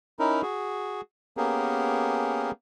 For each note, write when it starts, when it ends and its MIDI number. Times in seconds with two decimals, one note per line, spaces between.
0.19 0.42 61
0.19 0.42 63
0.19 0.42 64
0.19 0.42 70
0.42 1.01 66
0.42 1.01 68
1.37 2.51 58
1.37 2.51 59
1.37 2.51 61
1.37 2.51 67
1.37 2.51 68
1.37 2.51 70